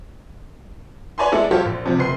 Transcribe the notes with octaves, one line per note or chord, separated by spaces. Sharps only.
B4 C#5 D5 G#5 B5 C6
G#3 B3 E4 A4 D5
F#3 F4 G4 A4 C5 C#5
A#1
C3 F3
F#1 B4 C6 C7